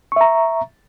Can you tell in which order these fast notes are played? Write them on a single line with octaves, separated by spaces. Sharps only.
C#6 E5 A#5